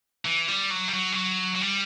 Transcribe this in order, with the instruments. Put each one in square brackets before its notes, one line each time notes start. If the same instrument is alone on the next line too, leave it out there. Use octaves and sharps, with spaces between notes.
[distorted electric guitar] E3
G3
F#3
G3
F#3
G3
F#3
F#3
G3